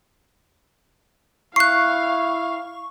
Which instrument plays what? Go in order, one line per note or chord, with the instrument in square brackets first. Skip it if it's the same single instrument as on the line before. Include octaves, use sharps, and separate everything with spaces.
[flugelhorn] E4 [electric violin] F5 [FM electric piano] C#6 [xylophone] F#6 C7